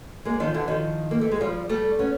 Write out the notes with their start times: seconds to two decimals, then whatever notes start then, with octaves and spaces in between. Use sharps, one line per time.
0.25 G#3 A#3
0.40 D#3 F3
0.54 D3 E3
0.68 D#3 F3
1.11 A#3
1.21 A3
1.32 G#3
1.41 F3 G3
1.69 G3 A3
1.99 B3 C#4